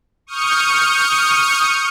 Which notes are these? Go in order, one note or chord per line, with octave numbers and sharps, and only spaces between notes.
C#6 D#6 F6 G6 C#7